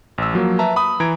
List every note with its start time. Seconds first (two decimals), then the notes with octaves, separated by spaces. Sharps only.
0.18 A1 E6
0.34 F3 F#3 A#3
0.59 B4 E5 A5 A#5
0.76 B5 D#6
1.00 E3 A#5 G#6 D7